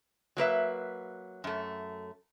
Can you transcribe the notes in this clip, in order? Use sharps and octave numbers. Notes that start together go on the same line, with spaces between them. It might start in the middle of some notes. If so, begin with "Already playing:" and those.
F#3 A#3 B4 E5
F#2 A3